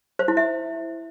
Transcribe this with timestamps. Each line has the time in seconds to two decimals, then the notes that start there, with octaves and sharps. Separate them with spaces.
0.19 C5
0.28 E4
0.37 E5